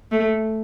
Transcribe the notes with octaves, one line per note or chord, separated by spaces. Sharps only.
A3